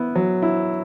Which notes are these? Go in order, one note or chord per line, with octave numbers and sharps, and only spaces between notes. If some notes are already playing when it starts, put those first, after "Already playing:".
Already playing: B3 E4
F#3
E4